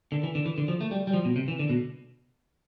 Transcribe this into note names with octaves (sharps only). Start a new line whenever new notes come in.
D3
E3
D3
E3
D3
F3
A3
G3
G3
F3
B2
C3
E3
D3
B2